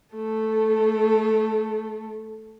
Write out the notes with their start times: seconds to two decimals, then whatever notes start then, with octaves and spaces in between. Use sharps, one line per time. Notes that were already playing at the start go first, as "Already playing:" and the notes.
0.14 A3 A4